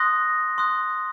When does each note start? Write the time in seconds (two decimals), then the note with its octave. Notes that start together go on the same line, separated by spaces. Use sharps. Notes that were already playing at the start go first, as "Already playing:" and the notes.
Already playing: C6 D#6 F#6 A#6
0.58 C6 D#6 F#6